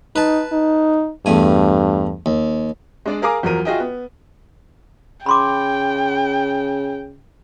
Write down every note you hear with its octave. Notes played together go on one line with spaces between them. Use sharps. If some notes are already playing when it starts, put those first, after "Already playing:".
D#4 B4 A5
D#4
E2 G2 A3 G#5
D#2
G#3 D4 D5
G#4 A#4 F5 G#5 A#5 D6
E2 F3 F#3 A#4 D#7
F4 F#4 G#4 D#5 E5 G5
B3
C#3 G5 B5 C6 D6